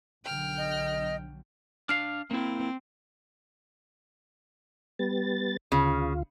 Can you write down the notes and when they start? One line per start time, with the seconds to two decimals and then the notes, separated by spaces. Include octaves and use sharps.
0.25 B1 D3 F#3 G5 F6
0.58 D#5
1.89 D4 F5 F6 C7
2.31 A#3 C4 E4
4.99 G3 B3 A6
5.72 D2 C#3 F4